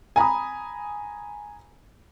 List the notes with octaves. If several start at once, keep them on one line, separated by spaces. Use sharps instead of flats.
G#5 A#5 B5 D#6